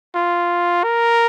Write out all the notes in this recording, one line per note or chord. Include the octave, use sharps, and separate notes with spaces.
F4
A#4